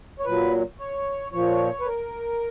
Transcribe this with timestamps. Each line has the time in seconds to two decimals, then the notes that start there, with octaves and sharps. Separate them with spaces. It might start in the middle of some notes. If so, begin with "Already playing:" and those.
0.20 C#5
0.25 A#2 F#3 B4
0.79 C#5
1.32 A#2 F3 C#5
1.80 B4
1.86 A#4